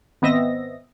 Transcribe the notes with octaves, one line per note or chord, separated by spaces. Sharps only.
G#1 B3 C4 D#5 E5 A#6